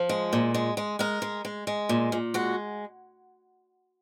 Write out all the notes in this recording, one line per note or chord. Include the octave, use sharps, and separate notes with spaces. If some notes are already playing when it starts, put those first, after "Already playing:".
Already playing: F3
G#3
A#2
G#3
G#3
G#3 A#4
G#3
G#3
G#3
A#2
A#2
G#3 F#4